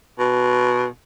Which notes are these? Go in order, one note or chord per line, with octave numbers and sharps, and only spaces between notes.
B2